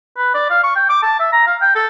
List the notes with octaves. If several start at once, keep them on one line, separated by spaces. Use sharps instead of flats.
B4
D5
F5
C#6
G5
D6
A5
E5
A#5
F5
G5
A4